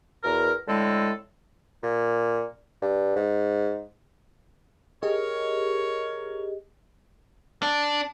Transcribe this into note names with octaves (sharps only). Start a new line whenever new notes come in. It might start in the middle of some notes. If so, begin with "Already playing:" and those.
E2 B2 A#4
A2 D3 G#3 C4 A4
A#2
G2
G#2
G4 G#4 A#4 C#5 D#5
D4